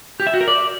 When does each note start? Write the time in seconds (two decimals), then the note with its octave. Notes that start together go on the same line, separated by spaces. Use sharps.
0.20 G4
0.27 E5
0.34 F#4
0.41 A#4
0.48 D5